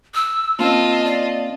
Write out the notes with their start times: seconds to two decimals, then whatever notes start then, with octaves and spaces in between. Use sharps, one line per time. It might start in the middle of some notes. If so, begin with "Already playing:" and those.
0.15 E6
0.59 A#3 C4 C#4 F4 D#5 A5
1.05 D5